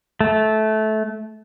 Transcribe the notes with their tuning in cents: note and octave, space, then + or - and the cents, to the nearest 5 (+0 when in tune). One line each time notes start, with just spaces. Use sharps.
A3 -20